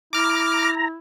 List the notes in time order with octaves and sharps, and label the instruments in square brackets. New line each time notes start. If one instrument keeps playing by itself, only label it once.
[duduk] E4 [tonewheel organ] A#5 [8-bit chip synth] D6 F6